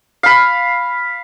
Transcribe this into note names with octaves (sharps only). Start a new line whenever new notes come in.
F5 B5